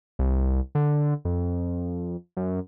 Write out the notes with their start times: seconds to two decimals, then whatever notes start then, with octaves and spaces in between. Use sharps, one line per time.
0.19 C2
0.75 D3
1.25 F2
2.37 F#2